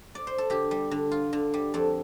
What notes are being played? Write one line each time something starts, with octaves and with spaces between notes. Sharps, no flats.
D5
C5
A4
D3 G4
G3
D3
F4
D3
G3
F2 A4